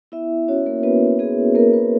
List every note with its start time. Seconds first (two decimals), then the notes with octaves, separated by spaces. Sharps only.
0.12 B3 E4 E5
0.48 C#4 F#4 C#5
0.65 A#3 A#4
0.83 B3 F#4 B4
1.19 B3 G#4
1.55 A#3 B3 A#4
1.72 B3 B4